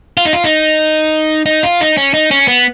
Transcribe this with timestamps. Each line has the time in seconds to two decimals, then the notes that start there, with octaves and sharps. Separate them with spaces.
0.17 F4
0.25 D#4
0.33 F4
0.44 D#4
1.46 D#4
1.63 F4
1.81 D#4
1.97 C#4
2.14 D#4
2.31 C#4
2.48 B3